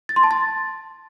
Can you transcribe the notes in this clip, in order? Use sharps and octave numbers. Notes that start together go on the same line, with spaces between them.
A6
C6
A5
A6